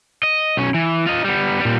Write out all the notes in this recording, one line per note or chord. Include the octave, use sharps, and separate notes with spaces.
D#5
B1 C#4
E3
F4 D#5
G3 B3
A#2 G3